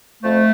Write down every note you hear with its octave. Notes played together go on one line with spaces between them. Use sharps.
F2 A3